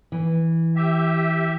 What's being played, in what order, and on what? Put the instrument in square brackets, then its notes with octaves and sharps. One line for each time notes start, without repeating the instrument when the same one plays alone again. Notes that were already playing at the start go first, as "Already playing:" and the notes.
[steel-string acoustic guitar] E3
[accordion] G4 E5